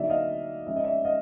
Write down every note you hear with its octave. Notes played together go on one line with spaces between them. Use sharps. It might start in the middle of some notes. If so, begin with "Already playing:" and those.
Already playing: D3 F#3 A#3 D#4 D5 E5
D#5 F5
F3 G#3 C#4 E5
D#5
D5 E5
D#5 F5